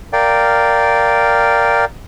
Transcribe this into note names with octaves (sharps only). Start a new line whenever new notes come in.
A#4 D5 F5 G5